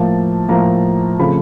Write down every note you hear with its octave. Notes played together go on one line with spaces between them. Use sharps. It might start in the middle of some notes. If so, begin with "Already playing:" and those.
Already playing: A2 F3 A#3 A5
A2 F3 A#3 A#5
C#3 F3 A3 C4 B5